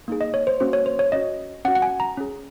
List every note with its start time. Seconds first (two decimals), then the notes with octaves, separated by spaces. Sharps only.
0.08 A#3 D#4 G#4
0.21 D#5
0.34 C#5
0.47 C5
0.60 A#3 C#4 F#4 C5
0.73 C#5
0.86 C5
0.99 C#5
1.12 C#4 F#4 D#5
1.65 C#4 F#5
1.68 F#4
1.75 F#5
1.82 G#5
2.00 A#5
2.17 C#4 G#4